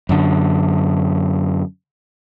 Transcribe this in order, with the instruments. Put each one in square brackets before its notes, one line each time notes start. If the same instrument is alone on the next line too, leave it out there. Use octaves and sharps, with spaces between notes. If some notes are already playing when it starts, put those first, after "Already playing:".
[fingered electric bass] F#2 D3